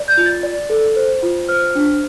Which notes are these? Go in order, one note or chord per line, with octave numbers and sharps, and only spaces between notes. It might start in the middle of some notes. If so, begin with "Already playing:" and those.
Already playing: D5
G6
F4
A6
D5
A4
C5
F4
C5 F6
D4